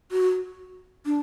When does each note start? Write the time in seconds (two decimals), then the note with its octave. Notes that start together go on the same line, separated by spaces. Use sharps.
0.12 F#4
1.06 D4